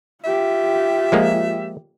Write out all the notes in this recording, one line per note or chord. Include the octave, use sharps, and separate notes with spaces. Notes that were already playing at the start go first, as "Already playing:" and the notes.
F4 G4 E5
F3 G#3 A#3